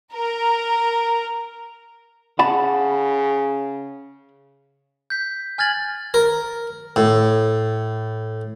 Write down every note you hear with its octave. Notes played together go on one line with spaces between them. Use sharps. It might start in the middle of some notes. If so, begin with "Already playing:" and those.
A#4
C#3 F#5 A5 B5
G6 B6
G#5 F6 G#6 A6 F#7
A#4
A2